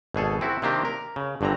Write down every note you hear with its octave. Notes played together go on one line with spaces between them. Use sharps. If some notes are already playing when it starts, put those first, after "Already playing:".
G#1 B2 G#4 A4
C4 E4 F#4
C3 D#3 A#3 C4 D4 G4
A#4
C#3
G1 G2 D3 C4 A#5